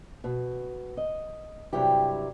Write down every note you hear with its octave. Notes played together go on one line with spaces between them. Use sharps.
B2
D#5
G2 C3 F#3 E4 G4